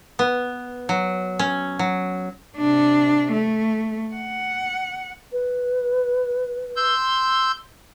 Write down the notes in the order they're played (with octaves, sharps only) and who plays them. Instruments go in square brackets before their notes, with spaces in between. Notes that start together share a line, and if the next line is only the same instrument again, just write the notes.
[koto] B3
F#3
C#4
F#3
[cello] C3 D4
A3
F#5
[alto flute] B4
[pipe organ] C6 E6 G6